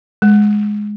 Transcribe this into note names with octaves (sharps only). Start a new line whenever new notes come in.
G#3